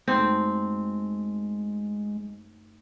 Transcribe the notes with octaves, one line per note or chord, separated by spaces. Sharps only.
F#2 G#3 A3 C4 D#4